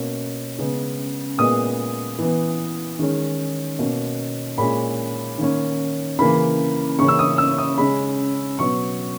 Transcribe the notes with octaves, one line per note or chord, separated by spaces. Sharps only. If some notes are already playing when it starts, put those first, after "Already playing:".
Already playing: B2 A#3 C#4
C#3 G#3 B3
A#2 G#3 B3 D#6
E3 B3
D#3 G#3 C#4
B2 A#3 C#4
A#2 G#3 C#4 B5
D#3 A#3 C#4
C#3 E3 A#3 B5
C#3 E3 A#3 C#4 C#6
E6
D#6
E6
D#6
C#3 G#3 C#4 B5
B2 F#3 B3 C#6